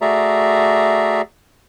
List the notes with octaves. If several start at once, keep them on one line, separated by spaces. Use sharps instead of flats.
A3 F#4 G#4 D5 E5 A#5